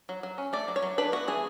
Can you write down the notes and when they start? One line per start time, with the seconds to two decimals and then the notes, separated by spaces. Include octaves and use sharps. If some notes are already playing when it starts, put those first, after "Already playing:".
0.09 F#3
0.23 F#3
0.38 C#4
0.53 A3 D5
0.68 F#3
0.76 C#5
0.82 F#3
0.98 D4 B4
1.12 B3 F#4
1.28 E3 G#4